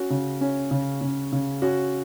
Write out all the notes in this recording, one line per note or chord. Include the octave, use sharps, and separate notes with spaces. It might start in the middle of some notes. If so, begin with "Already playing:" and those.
Already playing: C#4 F#4
C#3
C#4
C#3
C#3
C#3
C#4 F#4